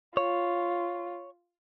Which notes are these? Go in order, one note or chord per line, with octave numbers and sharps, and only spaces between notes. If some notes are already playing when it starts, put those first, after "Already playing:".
F4 C#5